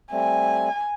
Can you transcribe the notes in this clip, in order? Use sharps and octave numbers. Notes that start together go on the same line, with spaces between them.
G3 A3 C4 G#5